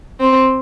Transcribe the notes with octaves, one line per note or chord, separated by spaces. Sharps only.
C4